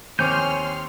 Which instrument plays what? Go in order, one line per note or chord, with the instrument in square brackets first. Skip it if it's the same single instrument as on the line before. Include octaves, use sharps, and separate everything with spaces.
[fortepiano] D#2 C4 D6 [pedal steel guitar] C#5 G#5 G6 [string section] C6 F6